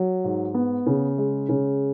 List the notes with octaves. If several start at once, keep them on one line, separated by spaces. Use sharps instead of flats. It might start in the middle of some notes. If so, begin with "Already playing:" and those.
Already playing: F#3
G#2
B3
C#3
G#3
C#3